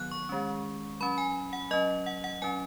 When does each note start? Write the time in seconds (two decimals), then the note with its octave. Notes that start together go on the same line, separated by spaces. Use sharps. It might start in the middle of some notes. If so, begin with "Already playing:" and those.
Already playing: D#3 F#3 B3 F#6
0.11 C#6
0.29 D#3 G#3 C#4
1.00 F#3 C#4 B5
1.18 G#5
1.53 F#5
1.71 F#3 C#4 D#5
2.06 F#5
2.24 F#5
2.42 F#3 C#4 G#5